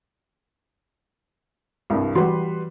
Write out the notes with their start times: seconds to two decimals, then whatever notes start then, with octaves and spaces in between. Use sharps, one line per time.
1.90 C2 G2
2.15 E3 G3 F#4 B4 C6